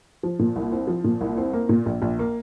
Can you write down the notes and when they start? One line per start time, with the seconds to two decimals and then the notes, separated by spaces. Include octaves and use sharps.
0.23 F3
0.39 A#2
0.56 C2
0.72 C4
0.87 F3
1.04 A#2
1.21 C2
1.38 C4
1.53 A#3
1.69 A#2
1.86 A#1
2.02 A#1
2.19 A#3